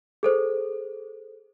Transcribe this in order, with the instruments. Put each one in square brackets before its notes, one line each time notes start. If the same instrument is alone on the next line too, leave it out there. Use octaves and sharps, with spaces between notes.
[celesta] G#4 A4 C5